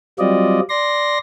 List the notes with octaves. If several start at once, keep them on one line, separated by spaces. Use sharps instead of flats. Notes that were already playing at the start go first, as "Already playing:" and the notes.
F#3 G3 C4 F4 D5 D#5
D5 C6 A#6